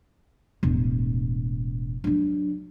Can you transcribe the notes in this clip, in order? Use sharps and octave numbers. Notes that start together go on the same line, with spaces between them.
E1 A1
F#3 D4